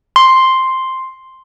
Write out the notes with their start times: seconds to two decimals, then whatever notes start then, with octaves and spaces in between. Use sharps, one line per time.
0.16 C6